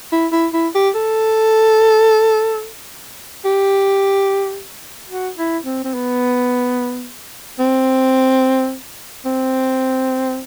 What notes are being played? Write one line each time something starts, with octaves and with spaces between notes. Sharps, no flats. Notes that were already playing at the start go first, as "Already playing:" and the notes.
E4
E4
E4
G4
A4
G4
F#4
E4
C4
C4
B3
C4
C4